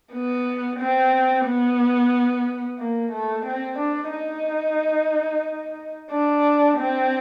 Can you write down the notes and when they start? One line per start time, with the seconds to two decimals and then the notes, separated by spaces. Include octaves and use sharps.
0.13 B3
0.79 C4
1.46 B3
2.79 A#3
3.12 A3
3.46 C4
3.78 D4
4.12 D#4
6.11 D4
6.77 C4